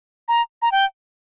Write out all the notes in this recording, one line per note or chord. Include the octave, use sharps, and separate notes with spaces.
A#5
A#5
G5